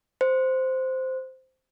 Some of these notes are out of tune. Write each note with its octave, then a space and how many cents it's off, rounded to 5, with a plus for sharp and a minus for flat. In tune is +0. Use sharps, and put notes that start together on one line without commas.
C5 -5